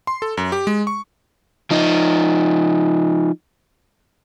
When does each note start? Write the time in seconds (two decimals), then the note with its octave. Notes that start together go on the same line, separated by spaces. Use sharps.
0.07 C6
0.22 A4
0.37 F#2
0.52 G4
0.67 G#3
0.87 C#6
1.71 F3 D#4